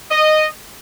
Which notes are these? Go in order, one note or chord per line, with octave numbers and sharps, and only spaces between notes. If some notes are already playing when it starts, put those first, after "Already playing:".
D#5